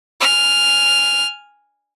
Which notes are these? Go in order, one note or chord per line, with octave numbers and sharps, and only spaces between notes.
G#5 F6